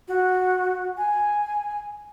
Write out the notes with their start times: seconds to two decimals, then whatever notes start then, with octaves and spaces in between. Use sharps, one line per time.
0.08 F#4
0.97 G#5